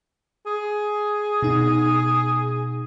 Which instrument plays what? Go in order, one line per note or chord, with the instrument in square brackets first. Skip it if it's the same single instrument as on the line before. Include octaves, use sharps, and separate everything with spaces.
[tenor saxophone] G#4
[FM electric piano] B2 D#4